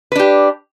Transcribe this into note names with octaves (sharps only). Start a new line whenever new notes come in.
D4 G4 B4